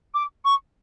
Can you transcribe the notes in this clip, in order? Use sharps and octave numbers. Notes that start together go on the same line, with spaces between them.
D6
C#6